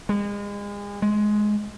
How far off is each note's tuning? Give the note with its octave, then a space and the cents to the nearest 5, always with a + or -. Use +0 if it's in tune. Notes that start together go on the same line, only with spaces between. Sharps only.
G#3 -35
G#3 +10